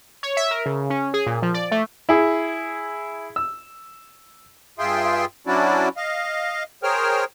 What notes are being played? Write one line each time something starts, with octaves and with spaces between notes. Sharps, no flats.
C#5
E5
A#4
C#3
C#4
G#4
A#2
F3
D5
A3
E4 G#4
E6
G2 F4 G#4 E5 G5 C6
F#3 C#4 D4 E4 F#4 D5
D#5 F5
G#4 A#4 C5 C#5 G5 F6